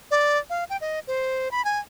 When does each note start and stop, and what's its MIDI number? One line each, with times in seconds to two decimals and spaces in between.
0.11 0.38 74
0.50 0.64 77
0.70 0.77 79
0.81 1.00 75
1.07 1.51 72
1.51 1.64 83
1.65 1.79 80